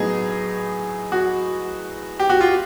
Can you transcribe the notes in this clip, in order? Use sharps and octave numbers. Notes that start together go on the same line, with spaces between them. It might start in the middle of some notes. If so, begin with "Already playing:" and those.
Already playing: A2 F#3 B3 D#4 G#4
F#4
G4
F#4
F4